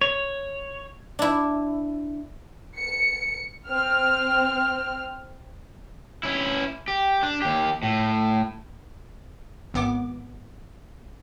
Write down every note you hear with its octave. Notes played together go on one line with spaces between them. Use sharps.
C#5
D4 E4
C#7
C4 F6
C#4 E4
G4
D4
D#2 G4
A2
G#1 B3 D6